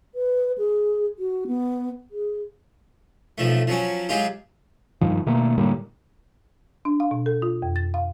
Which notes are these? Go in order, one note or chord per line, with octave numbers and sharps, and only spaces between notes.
B4
G#4
F#4
B3
G#4
B1 F3 A3
F3 F#3 C#4
F#3 G#3 F4 G4
G2 D#3 F3
B2 D#3 A3 A#3
A2 D3 G3 A#3
D4
F5
B2
A4
F4
F2
A6
F5